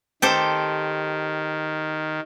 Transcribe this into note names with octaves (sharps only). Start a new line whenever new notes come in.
D#3 G4 A4 C5